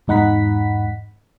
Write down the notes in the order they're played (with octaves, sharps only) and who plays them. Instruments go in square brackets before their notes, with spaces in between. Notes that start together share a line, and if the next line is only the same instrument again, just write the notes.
[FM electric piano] E2 G#2 D#4 F#5 B5 B6